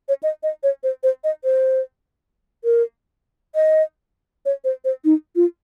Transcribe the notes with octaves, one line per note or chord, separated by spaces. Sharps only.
C#5
D#5
D#5
C#5
C5
C5
D#5
C5
A#4
D#5
C#5
C5
C5
D#4
F4